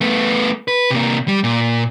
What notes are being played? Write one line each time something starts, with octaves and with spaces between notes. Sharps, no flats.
A3 B3
B4
C3 A#3
G3
A#2